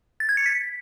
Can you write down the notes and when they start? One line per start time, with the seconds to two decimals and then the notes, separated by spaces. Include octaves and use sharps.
0.20 A6
0.29 G#6
0.37 C#7
0.46 B6